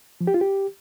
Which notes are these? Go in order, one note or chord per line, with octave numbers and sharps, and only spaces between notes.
F3
G4
F4
G4